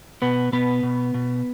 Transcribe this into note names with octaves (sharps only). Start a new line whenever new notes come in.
B2 B3 B4
B2 B3 B4
B2
B2